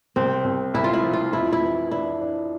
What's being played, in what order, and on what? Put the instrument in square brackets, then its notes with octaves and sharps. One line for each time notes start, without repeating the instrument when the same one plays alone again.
[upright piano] C2 [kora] C4
[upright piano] C2
[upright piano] C2 [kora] E4
[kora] F4
E4
[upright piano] F3
[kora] F4
[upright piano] F2 [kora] E4
[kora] E4
[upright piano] E3
[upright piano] D4 [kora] E4
[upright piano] D4